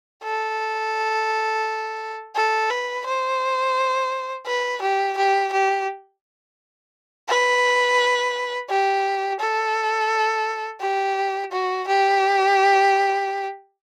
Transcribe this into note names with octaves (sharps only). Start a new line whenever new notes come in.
A4
A4
B4
C5
B4
G4
G4
G4
B4
G4
A4
G4
F#4
G4